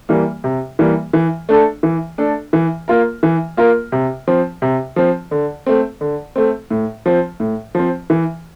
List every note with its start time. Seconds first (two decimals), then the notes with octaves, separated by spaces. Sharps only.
0.09 E3 G3 A#3
0.44 C3
0.79 E3 G3 A#3
1.13 E3
1.49 A3 D4 A4
1.83 E3
2.18 A3 D4 A4
2.53 E3
2.88 A#3 F4 A#4
3.23 E3
3.57 A#3 F4 A#4
3.92 C3
4.28 F3 C4
4.62 C3
4.96 F3 C4
5.31 D3
5.66 A3 C4
6.01 D3
6.36 A3 C4
6.71 A2
7.06 F3 C4
7.40 A2
7.75 F3 C4
8.10 E3